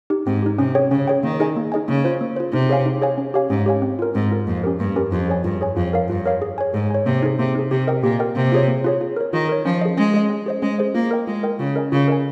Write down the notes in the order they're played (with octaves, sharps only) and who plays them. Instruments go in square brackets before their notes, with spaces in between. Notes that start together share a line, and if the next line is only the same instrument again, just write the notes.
[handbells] D#4 G4
[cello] G#2 [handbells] C4
[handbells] D#4 G4
[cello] C3 [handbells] C#4
[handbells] G#4 C#5 G5
[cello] C#3 [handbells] C#4
[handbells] G#4 C#5 G5
[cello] D#3 [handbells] A#3
[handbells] D#4 G#4 D#5 G#5
A#3
D#4 G#4 D#5 G#5
[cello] C#3 [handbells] A#3
[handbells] F4 C5
A#3
F4 C5
[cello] C3 [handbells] D#4
[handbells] G#4 C#5 F5 G#5
D#4
G#4 C#5 F5 G#5
C#4
G4 C#5 F5 G#5
[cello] G#2 [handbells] C#4
[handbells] G4 C#5 F5 G#5
C4
F4 A#4
[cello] G#2 [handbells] C4
[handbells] F4 A#4
[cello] F2 [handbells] A#3
[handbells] C#4 G4 A#4
[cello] G2 [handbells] A#3
[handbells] C#4 G4 A#4
[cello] F2 [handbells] F4
[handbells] G#4 C#5 G#5
[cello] G2 [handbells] F4
[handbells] G#4 C#5 G#5
[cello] F2 [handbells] F4
[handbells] A#4 C#5 F5
[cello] G2 [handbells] F4
[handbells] A#4 C#5 F5
G#4
C#5 G#5
[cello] G#2 [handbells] G#4
[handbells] C#5 G#5
[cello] C3 [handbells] A#3
[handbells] D#4 G#4
[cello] C3 [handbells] A#3
[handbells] D#4 G#4
[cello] C3 [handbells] G4
[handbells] A#4 D#5 G5
[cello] A#2 [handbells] G4
[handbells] A#4 D#5 G5
[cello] C3 [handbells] A#3
[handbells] F4 G#4 C#5
A#3
F4 G#4 C#5
F4
A#4 C#5
[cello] D#3 [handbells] F4
[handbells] A#4 C#5
[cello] F3 [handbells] C#4
[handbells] G#4 D#5
[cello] G#3 [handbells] C#4
[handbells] G#4 D#5
C#4
G#4 C5 D#5
[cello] G#3 [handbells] C#4
[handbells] G#4 C5 D#5
[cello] A#3 [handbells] F4
[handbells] A#4 D#5 G5
[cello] G#3 [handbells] F4
[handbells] A#4 D#5 G5
[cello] C#3 [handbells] F4
[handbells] A#4 D#5 G#5
[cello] C#3 [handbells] F4
[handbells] A#4 D#5 G#5